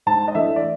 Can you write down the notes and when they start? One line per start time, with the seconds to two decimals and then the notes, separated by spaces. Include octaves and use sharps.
0.06 G#2 A5
0.28 D#5
0.35 E3 A3 D4 E5
0.56 D5